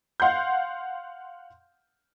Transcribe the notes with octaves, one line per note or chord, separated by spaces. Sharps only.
F5 F#5 C6 G6